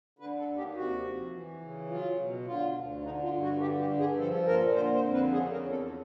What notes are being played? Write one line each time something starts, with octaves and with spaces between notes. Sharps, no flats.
D3 B4
A4
D#2
G4
C3 F#4
F2
E3
C#3
F#3 F4
B2
D3 F4
D2
D3 D#4
F4
G2
F#4
D3 G4
G4
G2
G#4
F3 A4
A#2 A#4
D3 C5
C5
F2
B4
C#3 G#4
A#4
E2
A4